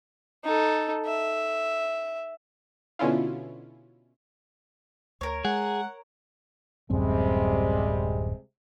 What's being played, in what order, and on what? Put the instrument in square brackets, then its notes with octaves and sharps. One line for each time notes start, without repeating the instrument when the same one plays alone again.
[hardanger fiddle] D#4 A4
E5
[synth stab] B2 D3 C#4 E4 F4
[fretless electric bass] D2 [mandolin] A#4 C#5
[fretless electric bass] G#3 [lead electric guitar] G#4 [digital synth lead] F#5
[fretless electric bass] D1 F#2 C4 [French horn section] C3 G3 G#3